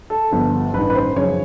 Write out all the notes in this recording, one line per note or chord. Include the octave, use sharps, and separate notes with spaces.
A4
G1 G2 D3 F3
A1 G2 D#3 B4
B4
C5
F#2 C#3 F3 C#5